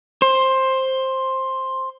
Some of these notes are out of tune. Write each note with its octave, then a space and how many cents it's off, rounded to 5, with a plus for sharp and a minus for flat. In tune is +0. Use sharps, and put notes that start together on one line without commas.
C5 +10